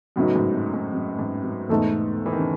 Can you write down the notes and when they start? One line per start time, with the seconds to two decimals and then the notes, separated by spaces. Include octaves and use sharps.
0.16 F#2 A2 C#3 F#3 B3 D#4
0.36 G#2
0.54 F#2
0.74 G#2
0.94 F#2
1.19 G#2
1.44 F#2
1.69 E2 G#2 B2 A3 D#4 A4
2.26 E3
2.33 D#3
2.39 C#3